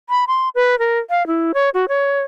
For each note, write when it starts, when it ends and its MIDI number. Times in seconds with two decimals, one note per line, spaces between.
0.09 0.24 83
0.27 0.49 84
0.55 0.78 71
0.79 0.99 70
1.10 1.26 77
1.27 1.52 64
1.54 1.69 73
1.74 1.85 66
1.88 2.21 73